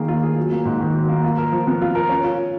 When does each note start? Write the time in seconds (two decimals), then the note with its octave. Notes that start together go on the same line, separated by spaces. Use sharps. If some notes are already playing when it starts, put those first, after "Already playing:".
Already playing: D#3 A#3 G#4
0.08 F4
0.23 G#4
0.37 F#3
0.52 A#3
0.65 G#2
0.80 D#3
0.94 F#3
1.09 A#3
1.24 F4
1.38 A#4
1.52 F3
1.67 B3
1.82 F4
1.95 A#4
2.09 C#4
2.24 F4